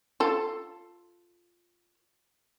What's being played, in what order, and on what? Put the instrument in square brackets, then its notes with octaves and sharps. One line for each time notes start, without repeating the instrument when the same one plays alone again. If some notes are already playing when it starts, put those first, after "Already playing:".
[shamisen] F4 A4